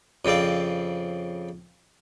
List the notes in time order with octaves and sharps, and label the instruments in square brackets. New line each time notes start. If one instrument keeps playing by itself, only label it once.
[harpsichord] F2 C#3 C4 D5 F5